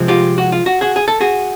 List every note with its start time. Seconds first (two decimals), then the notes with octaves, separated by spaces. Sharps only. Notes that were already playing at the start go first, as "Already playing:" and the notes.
Already playing: C3 F3 G#3 C4
0.08 F4 G4
0.38 F#4
0.52 F4
0.66 F#4
0.81 F#4 G#4
0.96 G#4
1.08 A4
1.20 F#4 G#4